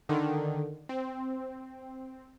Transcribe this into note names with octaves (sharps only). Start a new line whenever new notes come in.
D3 D#3
C4